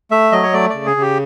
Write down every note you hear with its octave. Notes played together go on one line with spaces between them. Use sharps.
A3 E5
F#3 D#5
C#5
A3 D5
C#3 D5
G#4
C#3 G4